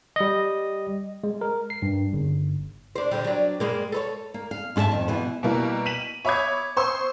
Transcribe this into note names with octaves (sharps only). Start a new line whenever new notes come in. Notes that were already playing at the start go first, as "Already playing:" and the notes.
G3 D#5
G#3
A#4
C7
G2
G1
D4 C5
D3 G3
F#3 D4
G2 G#3 A#3
A4 B4 C#5
A#3
F5
G#2 F4 G#4 E5 A5
F2 D#3
B2 E3 B3
B2 G3 A#3 E4
B6 D#7 E7 F#7
C#5 E5 B5 D6 D#6 G#6
C5 C6 C#6 D#6 E6